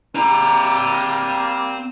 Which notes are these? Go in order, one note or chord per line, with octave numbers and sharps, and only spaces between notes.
G3 A#3 C4 A#5